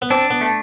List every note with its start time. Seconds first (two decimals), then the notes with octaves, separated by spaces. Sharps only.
0.02 B3
0.10 C4 D4
0.30 B3
0.41 A3